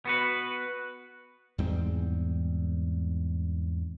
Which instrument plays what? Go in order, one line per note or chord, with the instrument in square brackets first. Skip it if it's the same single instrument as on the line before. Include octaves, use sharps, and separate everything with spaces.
[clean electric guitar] B3 F#4 B4
[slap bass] E2 G#2 G3 C4